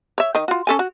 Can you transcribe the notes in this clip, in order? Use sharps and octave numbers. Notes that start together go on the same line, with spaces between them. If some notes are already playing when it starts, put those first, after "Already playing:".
C#5 E5
D#3 D#5
F4 F#4
C#4 A4 G#5
F#4